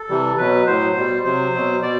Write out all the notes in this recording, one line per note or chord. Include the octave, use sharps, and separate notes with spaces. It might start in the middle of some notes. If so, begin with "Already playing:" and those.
Already playing: A4
C3 E3 G3
B2 F#3 B4
A2 F#3 C5
B2 G3
C3 F#3 C5
B2 F#3
B2 D5